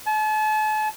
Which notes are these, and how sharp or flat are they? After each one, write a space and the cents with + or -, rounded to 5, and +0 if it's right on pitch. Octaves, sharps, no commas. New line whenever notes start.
A5 -40